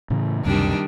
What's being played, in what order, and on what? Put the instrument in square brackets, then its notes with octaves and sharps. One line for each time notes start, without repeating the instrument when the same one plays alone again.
[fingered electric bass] A2 C#3 E3
[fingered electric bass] C#2 F#2 C3 [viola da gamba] D#3 G3 D4